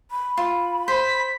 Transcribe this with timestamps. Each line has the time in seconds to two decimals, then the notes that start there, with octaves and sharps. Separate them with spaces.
0.11 B5
0.37 F4
0.88 C5 B6